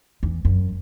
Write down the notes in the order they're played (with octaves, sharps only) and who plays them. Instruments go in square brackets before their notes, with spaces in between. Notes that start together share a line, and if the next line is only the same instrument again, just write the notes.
[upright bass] E2
F#2